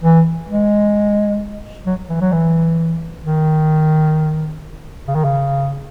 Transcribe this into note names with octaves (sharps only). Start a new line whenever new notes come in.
E3
G#3
F#3
E3
F#3
E3
D#3
C#3
D#3
C#3